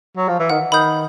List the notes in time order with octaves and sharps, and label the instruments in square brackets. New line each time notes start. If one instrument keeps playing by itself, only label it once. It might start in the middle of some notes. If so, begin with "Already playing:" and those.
[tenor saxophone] F#3
F3
E3
[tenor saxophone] D#3 [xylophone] F#5
[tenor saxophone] D#3 [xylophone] B5 D#6 G6